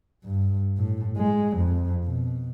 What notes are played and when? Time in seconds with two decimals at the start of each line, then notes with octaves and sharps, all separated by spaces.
0.24 G2
0.77 A2
1.17 G#3
1.57 F2
2.04 B2